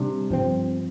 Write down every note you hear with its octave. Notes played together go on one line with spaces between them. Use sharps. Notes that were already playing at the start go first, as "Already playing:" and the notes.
Already playing: C3 G3 D4
G2 F3 C4